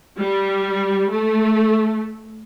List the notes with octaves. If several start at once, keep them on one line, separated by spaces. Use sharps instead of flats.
G3
A3